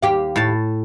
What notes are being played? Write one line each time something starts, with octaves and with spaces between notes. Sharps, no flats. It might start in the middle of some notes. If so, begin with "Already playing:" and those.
D#2 G4 F5
A2 A5